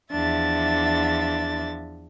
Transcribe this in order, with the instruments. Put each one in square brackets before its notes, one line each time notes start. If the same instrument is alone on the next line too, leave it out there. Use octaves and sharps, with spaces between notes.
[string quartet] E2 F3 D4 E5 A6